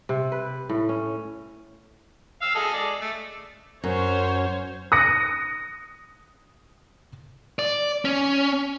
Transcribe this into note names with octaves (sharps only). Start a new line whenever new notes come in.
C3
B4
A2
C#4
F5 E6
G#4 A4 D#5
G#3 D5
A3
F#2 C#4 C5 C#5
D#6 F#6 A#6 C#7
D5
C#4